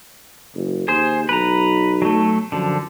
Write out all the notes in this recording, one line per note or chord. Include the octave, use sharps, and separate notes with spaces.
F#1
D#2 G#4 C5
B1 B4 A#5
F#3 A3
F#2 D3 F3